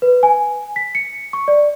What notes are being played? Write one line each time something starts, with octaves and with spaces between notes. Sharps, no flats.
B4
G#5
B6
C#7
C#6
D5